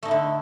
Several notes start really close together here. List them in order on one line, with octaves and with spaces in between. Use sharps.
A3 D#4 E4 D3